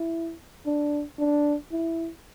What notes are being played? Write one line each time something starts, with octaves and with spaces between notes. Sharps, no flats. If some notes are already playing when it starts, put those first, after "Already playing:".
Already playing: E4
D4
D4
E4